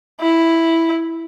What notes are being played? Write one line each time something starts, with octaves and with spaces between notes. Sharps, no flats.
E4